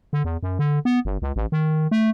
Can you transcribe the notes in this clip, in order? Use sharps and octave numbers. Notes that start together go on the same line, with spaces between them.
D3
E2
F#2
D3
B3
G1
C#2
A1
D#3
A3